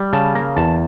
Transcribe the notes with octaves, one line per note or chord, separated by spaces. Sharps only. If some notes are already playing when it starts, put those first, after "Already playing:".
Already playing: G3
C#3 A5
A#3 A#5
E2 A5